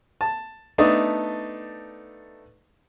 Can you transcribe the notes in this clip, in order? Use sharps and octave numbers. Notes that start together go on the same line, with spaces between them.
A5
A3 B3 D4 D#4